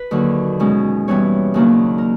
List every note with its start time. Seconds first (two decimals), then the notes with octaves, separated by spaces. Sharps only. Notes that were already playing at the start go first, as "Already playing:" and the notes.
Already playing: B4
0.11 D#2 D3 F#3
0.60 B2 G#3 C#4
1.08 G2 E3 G3 B3 C#5
1.54 D#2 C#3 F#3 A#3 D4
1.98 A#4